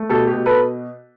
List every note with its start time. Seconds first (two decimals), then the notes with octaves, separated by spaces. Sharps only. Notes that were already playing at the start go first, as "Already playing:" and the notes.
Already playing: A3
0.09 B2 G4 A4
0.27 G4
0.34 B2
0.46 A4 B4